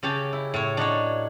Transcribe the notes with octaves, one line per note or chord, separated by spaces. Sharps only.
C#3 G4 C#5 A5
E4
A2 C#5
D4 D#4 F#4 C#5